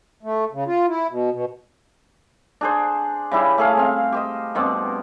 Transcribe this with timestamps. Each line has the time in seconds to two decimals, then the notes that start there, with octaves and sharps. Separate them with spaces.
0.23 A3
0.52 C#3
0.67 F4
0.88 E4
1.10 B2
1.31 B2
2.61 D4 G#4 C5
3.32 C#3 G3 E4 G4
3.58 A3 G#4 F5
3.77 C4 F5
4.12 G4 C5 D#5
4.55 G2 B2 C4 D6